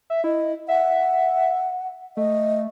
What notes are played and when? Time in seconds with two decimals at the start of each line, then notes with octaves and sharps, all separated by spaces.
0.10 E5
0.24 E4 D#5
0.68 E5 F#5
2.17 A3 D#5